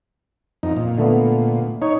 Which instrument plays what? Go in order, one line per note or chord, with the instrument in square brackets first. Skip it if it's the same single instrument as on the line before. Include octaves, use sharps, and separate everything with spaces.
[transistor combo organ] F2 D#4
A#2
[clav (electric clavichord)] D3 A3 B3
[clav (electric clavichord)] D#4 [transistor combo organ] C#5